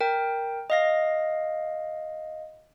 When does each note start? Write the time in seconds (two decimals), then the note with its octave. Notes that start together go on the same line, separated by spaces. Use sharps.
0.01 A#4 G5
0.70 D#5 F5 A#6